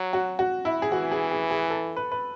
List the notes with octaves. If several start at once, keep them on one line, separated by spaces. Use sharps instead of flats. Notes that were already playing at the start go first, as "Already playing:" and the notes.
Already playing: F#3
F#4
F#4
E4
G#4
E3 F#4
G#4
G#4
G#4
A4
B4
B4